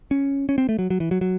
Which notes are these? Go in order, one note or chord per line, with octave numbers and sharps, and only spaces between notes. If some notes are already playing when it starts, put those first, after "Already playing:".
C#4
C#4
C4
A3
F#3
F#3
E3
F#3
F#3